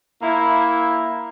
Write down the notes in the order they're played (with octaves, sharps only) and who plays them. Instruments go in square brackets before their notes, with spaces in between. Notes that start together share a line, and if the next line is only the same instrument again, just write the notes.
[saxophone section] A#3 E4